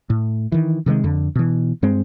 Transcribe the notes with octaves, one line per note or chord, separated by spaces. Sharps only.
A2
D#3 E3
C3 D#3 F3 G#3
F2 D3
B2 E3
G2 G#3 C4